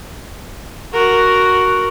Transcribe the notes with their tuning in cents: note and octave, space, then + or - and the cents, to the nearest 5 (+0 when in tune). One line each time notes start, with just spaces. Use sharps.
F#4 +0 A#4 +0